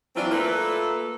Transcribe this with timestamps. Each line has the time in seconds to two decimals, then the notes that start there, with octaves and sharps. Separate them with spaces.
0.16 E3 F#3 C4 D4 E4 F4
0.31 A3 A#3 F4 A4 B4 E5